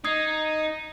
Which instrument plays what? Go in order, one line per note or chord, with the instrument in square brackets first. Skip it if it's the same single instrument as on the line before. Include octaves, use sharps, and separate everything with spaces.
[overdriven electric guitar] D#4 [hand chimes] D#6 G#6 C7